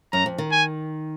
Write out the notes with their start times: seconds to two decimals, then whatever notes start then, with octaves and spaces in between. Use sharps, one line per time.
0.13 F#2 A#5
0.26 F2
0.38 D#3
0.52 G#5